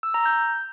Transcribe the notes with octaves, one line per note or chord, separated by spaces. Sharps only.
E6
A#5
G6